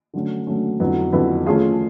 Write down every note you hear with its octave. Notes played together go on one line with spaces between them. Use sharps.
D3 F#3 A3 C#4
D3 F#3 A3 C#4
F2 D3 F#3 B3 E4
F2 D3 F#3 B3 E4
F3 A3 C#4 F4 G#4